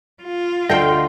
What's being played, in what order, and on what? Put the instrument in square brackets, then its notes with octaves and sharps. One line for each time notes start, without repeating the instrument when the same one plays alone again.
[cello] F4
[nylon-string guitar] D2 A3 [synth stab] A4 G5 [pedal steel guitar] D#5 F5 C6